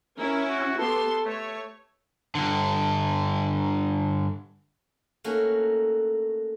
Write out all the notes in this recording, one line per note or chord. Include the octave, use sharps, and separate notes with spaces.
C#4 E4 A#4
F#4
B3 G4 A4 C6
A3 C#5
G2 D3
A3 A#3 C#4 D#4 F#4